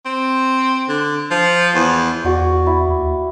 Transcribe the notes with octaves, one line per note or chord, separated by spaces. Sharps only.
C4
D3
F3
E2
E2 F#4 D5 C#6
E4
D#2